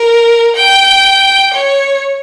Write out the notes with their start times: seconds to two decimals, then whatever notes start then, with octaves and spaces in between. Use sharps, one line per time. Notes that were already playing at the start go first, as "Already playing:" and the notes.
Already playing: A#4
0.56 G5
1.54 C#5